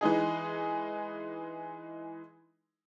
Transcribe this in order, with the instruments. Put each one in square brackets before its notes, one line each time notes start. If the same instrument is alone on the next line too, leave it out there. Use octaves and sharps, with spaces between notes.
[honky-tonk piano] E3 G#3 D#4 G#4